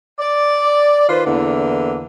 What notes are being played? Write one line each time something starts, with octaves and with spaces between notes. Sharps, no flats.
D5
D#3 F4 B4 C5
E2 D3 E3 A#3 D4